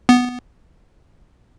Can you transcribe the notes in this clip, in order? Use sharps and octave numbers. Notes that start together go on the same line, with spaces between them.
B3